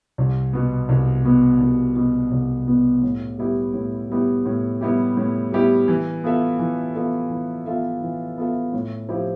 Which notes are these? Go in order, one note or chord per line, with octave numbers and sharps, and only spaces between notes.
C2
B2 B3
C2
B2 B3
C2
B2 B3
C2
B2 B3
A2
G3 B3 E4 G4
A2
G3 B3 E4 G4
A2
G3 B3 E4 G4
A2
G3 B3 E4 G4
E3
B3 F4 A4 E5
E3
B3 F4 A4 E5
E3
B3 F4 A4 E5
E3
B3 F4 A4 E5
A2
F3 C4 E4 G4